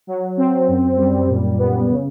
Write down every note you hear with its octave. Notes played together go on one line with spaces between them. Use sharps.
F#3
C4
F#2
G3
A#2
B3
C#3